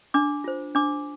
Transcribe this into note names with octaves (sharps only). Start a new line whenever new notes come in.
D4 D6
F4 C5
D4 D6